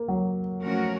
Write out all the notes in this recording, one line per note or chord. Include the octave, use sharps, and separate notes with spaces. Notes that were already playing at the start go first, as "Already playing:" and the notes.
Already playing: A#3
F#3
F3 A3 C#4 F#4 A#4